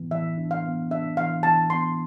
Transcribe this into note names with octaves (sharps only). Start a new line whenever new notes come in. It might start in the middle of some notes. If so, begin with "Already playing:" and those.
Already playing: A2 E3 B3
E3 E5
D4
F5
B3
D4 E5
E3 F5
E3 A5
B3 C6